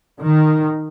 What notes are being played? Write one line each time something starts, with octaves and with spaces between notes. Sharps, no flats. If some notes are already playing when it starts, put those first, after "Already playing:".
D#3